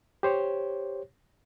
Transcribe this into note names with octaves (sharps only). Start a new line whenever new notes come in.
G4 C5 C#5